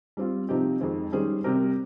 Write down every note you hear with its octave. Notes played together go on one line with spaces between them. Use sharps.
G3 C4 F4
C3 F3 C4 D#4 G4
F2 D#3 G#3 C4
D#3 G3 C#4 G#4 C5
C3 G3 C4 G4 A#4